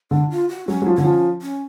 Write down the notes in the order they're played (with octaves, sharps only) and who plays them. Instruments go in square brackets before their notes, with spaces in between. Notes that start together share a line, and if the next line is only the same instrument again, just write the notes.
[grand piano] D3 [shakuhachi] D4
[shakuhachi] F4
F#4
[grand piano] F#3 [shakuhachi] C#4
[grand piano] F#3
F3
[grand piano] D3 [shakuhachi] C#4
[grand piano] F3
[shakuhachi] C#4